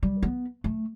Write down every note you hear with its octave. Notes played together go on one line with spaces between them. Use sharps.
G3
B3
A3